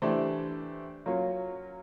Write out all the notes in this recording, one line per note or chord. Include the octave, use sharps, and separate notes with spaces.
E3 A3 D4 G4 C5
F#3 A#3 C#4 F4